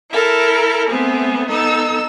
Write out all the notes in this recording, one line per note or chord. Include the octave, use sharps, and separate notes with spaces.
E4 A4 A#4
A3 B3 C4 G#4
B3 D#4 A4 E6